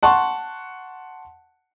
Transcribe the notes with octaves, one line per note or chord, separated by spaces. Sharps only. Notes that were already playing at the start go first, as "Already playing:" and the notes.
F#5 A5 C6 C#6